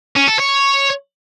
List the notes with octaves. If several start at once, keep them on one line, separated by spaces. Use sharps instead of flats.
C#4
A4
C#5